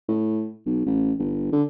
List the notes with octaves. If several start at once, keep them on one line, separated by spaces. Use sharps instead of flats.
A2
B1
A1
G1
D3